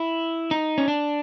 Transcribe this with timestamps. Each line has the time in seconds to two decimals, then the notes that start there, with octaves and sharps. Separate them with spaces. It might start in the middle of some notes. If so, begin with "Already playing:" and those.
Already playing: E4
0.51 D#4
0.78 C#4
0.88 D4